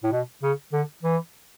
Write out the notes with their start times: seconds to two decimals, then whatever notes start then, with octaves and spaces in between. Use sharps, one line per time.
0.04 A2
0.12 B2
0.43 C#3
0.73 D3
1.03 E3